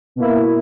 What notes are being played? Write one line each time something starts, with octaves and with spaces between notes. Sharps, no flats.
B2 A#3 E4